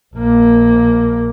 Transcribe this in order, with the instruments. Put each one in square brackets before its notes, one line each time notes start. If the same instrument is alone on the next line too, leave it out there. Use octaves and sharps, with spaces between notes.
[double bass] A#1 A#3